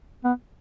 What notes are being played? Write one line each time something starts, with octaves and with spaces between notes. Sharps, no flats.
B3